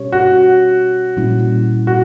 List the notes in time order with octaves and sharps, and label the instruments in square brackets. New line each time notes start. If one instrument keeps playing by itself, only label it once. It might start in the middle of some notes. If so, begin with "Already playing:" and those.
Already playing: [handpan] B2 G3 C#4 G4 C#5
[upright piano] F#4
[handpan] A#2 G3 C#4 E4
[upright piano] F#4